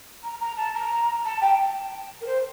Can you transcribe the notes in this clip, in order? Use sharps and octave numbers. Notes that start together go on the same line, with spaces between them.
A#5
A#5
A5
A#5
A5
G5
A#4
C5